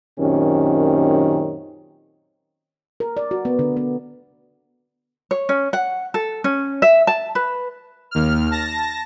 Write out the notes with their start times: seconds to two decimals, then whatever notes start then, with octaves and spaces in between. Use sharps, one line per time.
0.19 F#2 A#2 D#3 C4 C#4 G4
3.00 A#4
3.17 D5
3.31 F#4
3.45 B3
3.59 D3
3.77 B3
5.31 C#5
5.49 C#4
5.73 F#5
6.14 A4
6.44 C#4
6.82 E5
7.07 A5
7.35 B4
8.11 D#2 F6
8.51 A5 A#6